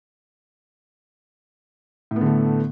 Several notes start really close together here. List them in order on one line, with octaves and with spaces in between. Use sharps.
A2 B3 D3 A3